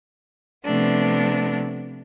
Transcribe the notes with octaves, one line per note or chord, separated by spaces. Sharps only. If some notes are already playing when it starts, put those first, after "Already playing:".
C3 F3 A3 B3 D4